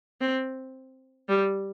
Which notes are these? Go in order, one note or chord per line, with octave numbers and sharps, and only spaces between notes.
C4
G3